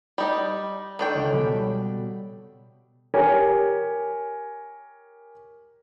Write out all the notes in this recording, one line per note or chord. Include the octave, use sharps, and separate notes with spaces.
G3 D#4
D#3 D4 A4 G5 C#6
C#2
B2 G3 B3
G4 A#4 C#5 G#5